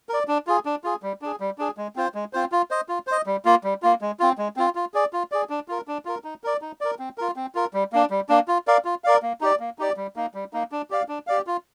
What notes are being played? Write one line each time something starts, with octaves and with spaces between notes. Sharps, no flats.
A#4 D5
D4
F4 G#4
D4
F4 G#4
G3
D4 G#4
G3
D4 G#4
G#3
C4 F4 C5
G#3
C4 F4 C5
F4
C5 D#5
F4
C5 D#5
G3
A#3 F4
G3
A#3 F4
G#3
C4 F4
G#3
C4 F4
F4
G#4 D5
F4
G#4 D5
D4
F4 A#4
D4
F4 A#4
D#4
A#4 D5
D#4
A#4 D5
C4
F4 A#4
C4
F4 A#4
G3
A#3 D4
G3
A#3 D4
F4
A#4 D5 F5
F4
A#4 D5 F5
A#3
D#4 G4 D5
A#3
D#4 G4 D5
G3
A#3 D#4
G3
A#3 D#4
D4
G4 D5 F5
D4
G4 D5 F5
F4